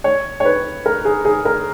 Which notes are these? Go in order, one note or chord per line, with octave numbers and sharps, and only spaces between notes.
C#5
C#5
B4
A#4
G#4
G#4
A#4